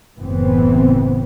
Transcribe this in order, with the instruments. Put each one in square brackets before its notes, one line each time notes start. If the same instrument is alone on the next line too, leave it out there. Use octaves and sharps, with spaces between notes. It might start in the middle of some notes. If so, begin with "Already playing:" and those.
[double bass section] F#1 A2 E3 B3 C4